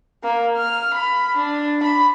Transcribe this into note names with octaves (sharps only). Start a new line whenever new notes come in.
A#3
F6
B5
D4
B5